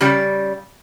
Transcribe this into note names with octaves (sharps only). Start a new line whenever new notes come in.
C#3 G3 D5